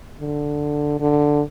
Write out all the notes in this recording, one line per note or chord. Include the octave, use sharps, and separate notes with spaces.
D3
D3